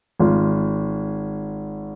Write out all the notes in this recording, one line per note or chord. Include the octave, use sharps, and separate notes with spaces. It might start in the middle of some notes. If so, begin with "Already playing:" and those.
G#1 F4